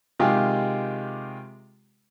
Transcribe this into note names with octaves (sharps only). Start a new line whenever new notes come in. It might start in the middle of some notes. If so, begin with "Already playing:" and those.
C3 D#3 G#3 F4 G4